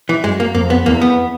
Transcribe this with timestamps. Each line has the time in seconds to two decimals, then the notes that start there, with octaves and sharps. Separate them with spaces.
0.09 E3
0.24 F#2 G#3
0.40 A#3
0.55 F2 A#3
0.70 B3
0.86 E2 A#3
1.01 B3